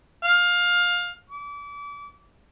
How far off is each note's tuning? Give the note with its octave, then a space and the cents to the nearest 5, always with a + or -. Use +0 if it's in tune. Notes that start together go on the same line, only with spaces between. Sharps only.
F5 +20
D6 -35